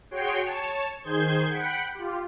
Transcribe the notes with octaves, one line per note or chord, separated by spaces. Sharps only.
F#4 G#4 C#5 G5 C6
C#5 A5
D#3 G#4 C5 G6 G#6
F#5 G5 B5
F4 G4